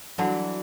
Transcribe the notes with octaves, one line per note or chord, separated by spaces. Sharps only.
D3 E3 F#3